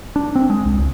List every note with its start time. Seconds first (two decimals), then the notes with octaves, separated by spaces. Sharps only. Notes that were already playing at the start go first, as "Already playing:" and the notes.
0.16 D4
0.35 C4
0.50 G#3
0.65 C2
0.78 C#2